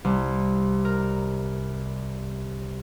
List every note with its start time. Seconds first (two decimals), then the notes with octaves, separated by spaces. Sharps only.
0.04 C2
0.85 A#4